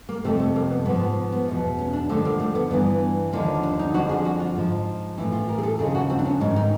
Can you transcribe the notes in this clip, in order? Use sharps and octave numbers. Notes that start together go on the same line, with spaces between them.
A#3
F2 C3 F3 A3
A3
A#3
B3
G#2 F3 B3
B3
B3
E2 B2
C#4
D4
D#2 D3 F3 A3
A#3
A3
B3
G2 E3 B3
D#2 D3 F3 A#3
D4
D#4
F2 D3 F3 F#4
G#4
F#4
F4
G#2 F3
A2 E3 E4
F4
A#4
G#4
A4
D#2 C#3 F3 G#4
F#4
C4
D4
C#4
G#2 D#3 C#4
D#4